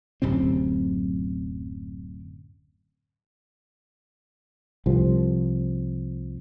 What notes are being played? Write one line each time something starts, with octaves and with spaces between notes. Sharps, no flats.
D1 F#2 C3 C4
C2 F3